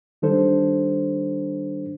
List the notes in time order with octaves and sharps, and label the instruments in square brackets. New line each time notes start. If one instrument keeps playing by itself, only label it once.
[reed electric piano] D#3 G3 D4 A4 C5